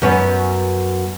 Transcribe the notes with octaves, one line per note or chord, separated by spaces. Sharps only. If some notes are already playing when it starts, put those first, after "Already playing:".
F#2 B3 C#4